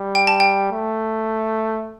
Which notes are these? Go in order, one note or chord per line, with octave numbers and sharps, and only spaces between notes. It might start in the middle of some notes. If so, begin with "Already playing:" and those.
Already playing: G3
G5
A5
G5
A3